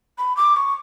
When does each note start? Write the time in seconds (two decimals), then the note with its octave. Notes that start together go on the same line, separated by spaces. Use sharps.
0.18 B5
0.37 D6
0.56 C#6